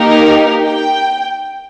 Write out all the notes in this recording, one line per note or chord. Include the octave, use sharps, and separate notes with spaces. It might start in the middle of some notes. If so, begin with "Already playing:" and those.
Already playing: A#3 D#4 G4 A#4
G5